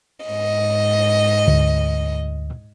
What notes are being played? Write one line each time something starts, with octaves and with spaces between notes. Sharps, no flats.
G#2 D#5
D2